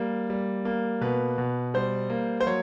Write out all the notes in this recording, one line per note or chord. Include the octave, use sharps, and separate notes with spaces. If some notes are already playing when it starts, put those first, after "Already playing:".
Already playing: G3 A#3
G3
A#3
B2 B4
B2
G3 C5
A#3
C5
F#3 C#5